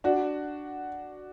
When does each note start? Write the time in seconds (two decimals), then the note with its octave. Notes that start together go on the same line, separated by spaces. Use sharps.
0.04 D4 F#4